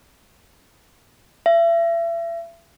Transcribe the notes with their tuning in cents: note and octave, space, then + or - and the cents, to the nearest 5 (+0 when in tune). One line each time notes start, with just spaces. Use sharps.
E5 +35